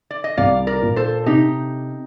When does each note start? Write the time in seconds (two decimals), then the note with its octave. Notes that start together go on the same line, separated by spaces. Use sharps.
0.11 D5
0.24 D#5
0.37 C2 D5 F5
0.67 A#4 D5
0.82 A#2
0.96 A4 C5
1.26 C3 D#4 G4